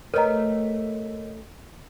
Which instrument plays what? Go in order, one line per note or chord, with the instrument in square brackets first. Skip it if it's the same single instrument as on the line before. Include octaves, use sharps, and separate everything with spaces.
[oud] A3 G4 [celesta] A#4 C#5 D#5 [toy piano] B4 A#5